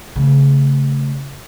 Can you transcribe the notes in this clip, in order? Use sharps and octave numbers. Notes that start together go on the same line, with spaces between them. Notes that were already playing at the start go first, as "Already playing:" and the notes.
C#3 A3